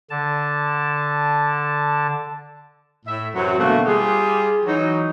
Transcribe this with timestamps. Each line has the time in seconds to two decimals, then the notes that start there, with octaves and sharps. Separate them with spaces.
0.10 D3 A5
3.06 A2 E5
3.34 F#2 C3 E3 F#3
3.59 B2 D3 E3 A3 A#3 F#4
3.86 G3 F4 G4 G#4
4.66 E3 F#3 D#4